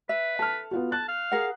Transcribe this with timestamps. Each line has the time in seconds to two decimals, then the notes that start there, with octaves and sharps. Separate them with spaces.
0.09 B4 E5
0.39 A4 A5 F6
0.71 B3 F4 F#4
0.92 A5 F#6
1.08 F5
1.31 G#4 A#4 F#5